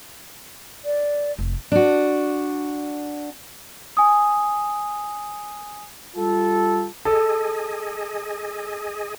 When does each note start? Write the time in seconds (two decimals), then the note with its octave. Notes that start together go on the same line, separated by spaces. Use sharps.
0.85 D5
1.38 F1
1.72 D4 F#4
3.97 G#5 D#6
6.16 G3 F4 A4
7.05 G#4 A4 D#5